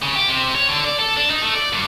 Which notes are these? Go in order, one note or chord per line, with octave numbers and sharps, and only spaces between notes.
C#3
G4
C3
C#5
D3
D5
A4
D4
D#4
A3
D5
G2